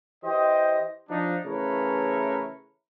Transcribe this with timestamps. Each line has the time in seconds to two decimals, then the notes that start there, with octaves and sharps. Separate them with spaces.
0.24 E3 G4 C5 D#5
1.10 F3 D4 D#4
1.45 C#3 E3 A3 A#4 B4 C#5